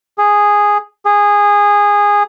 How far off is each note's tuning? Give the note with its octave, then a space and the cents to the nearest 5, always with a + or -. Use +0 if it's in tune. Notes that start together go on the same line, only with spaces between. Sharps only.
G#4 -5
G#4 -15